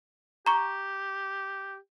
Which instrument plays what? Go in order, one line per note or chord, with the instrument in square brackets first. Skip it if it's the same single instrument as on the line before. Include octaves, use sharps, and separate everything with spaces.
[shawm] G4 [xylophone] A#5 C#6